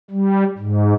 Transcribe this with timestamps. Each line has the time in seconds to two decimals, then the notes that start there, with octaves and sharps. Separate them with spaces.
0.11 G3
0.58 G#2